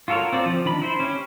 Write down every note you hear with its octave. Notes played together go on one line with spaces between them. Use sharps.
F4 F#4 A4 A#4 C#5
C4 F4 D5
F3
D#3 D4 B5
E4 C5
C#4 G4